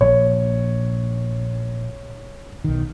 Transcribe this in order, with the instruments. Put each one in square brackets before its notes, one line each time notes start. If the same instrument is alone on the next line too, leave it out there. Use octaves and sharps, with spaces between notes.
[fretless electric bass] A#1 [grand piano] C#5
[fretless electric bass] B1 D#3